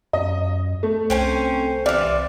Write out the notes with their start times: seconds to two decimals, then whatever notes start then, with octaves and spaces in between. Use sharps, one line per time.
0.13 F#2 D#5
0.83 A3
1.10 C2 C4 C#4 C5 G#5
1.86 C3 E3 D5 F6